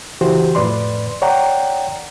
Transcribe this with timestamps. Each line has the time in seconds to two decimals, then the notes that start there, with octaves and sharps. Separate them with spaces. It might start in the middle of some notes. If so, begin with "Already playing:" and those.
0.21 C#3 E3 F#4 G4 C5
0.55 F2 A2 B4 D5 C6
1.22 C#5 D5 F#5 G5 A#5